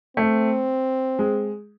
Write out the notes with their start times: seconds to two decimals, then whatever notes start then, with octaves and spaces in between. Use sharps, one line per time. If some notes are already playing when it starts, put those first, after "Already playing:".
0.17 A3 C4
1.19 G#3